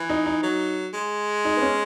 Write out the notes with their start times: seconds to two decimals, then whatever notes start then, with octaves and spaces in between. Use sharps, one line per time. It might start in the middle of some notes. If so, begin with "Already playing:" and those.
Already playing: E3
0.09 D#4
0.26 D#4
0.43 F#3
0.93 G#3
1.45 D#4
1.57 B3
1.61 C#4